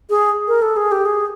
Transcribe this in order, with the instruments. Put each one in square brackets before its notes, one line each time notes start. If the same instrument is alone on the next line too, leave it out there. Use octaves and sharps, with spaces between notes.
[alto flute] G#4
A#4
A4
G#4
G4
G#4